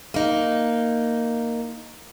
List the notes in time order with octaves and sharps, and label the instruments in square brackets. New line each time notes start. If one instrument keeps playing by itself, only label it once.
[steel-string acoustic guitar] A#3 D#4